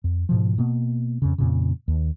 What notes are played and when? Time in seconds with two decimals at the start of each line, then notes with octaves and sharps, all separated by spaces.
0.04 F2
0.29 G#2 B2 F3
0.58 B2 A#3 B3
1.22 F2 C#3
1.38 F2 A#2 C#3
1.88 D#2